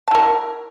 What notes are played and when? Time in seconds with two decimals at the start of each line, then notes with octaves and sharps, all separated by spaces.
0.08 A5
0.11 E4
0.15 A#4